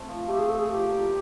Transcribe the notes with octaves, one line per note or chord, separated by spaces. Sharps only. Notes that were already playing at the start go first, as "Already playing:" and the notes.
Already playing: A3 C4
F3
A3 G4
G#4
C4 A4
G#4
F3 G4
A#2